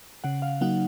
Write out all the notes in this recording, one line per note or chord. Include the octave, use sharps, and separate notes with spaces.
C#3 F#5
F5
F#3 A#3 D#4 F#5